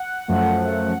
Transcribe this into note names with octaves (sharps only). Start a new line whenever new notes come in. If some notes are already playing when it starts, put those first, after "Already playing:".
Already playing: F#5
F#2 F3 A3